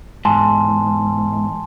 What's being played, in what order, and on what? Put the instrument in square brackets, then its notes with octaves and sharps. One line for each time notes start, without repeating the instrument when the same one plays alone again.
[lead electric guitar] E2 G#2 [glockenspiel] G#5 A5 C6